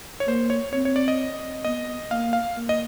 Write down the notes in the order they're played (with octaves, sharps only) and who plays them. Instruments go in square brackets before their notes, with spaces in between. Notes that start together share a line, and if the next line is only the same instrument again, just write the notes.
[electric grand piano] C#5
[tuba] A#3 [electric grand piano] C5
[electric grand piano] C#5
[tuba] C4 [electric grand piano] C#5
[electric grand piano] C#5
D5
D#5
[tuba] B3 [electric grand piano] D#5
[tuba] A#3 [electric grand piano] F5
[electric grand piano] F5
[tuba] A#3
[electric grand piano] D#5